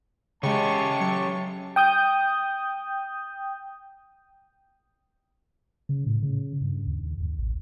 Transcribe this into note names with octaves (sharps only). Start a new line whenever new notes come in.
C#3 G#3 C#4 G4 A5 C#6
F#3 C#7
G5 D#6 G6
C#3
A2
C#3
G2
D#2
D#2
A1